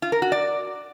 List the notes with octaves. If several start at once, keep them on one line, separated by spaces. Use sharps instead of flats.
F4
A#4
F#4
D5